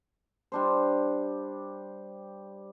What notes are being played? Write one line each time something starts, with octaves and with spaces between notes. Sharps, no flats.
G3 D4 C5